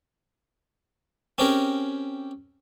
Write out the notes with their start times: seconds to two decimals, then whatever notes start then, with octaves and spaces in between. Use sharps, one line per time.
1.38 C4 C#4 G4 G#4 A#4